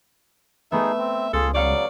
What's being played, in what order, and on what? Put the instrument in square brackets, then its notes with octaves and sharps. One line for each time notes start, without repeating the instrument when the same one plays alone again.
[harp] A3 B3 [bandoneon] D#4 G#4 [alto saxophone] E5
[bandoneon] C4
[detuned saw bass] C#2 [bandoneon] F4 G#4 [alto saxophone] A4
[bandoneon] C#3 F#3 [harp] C#5 F5 C#7 [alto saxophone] D5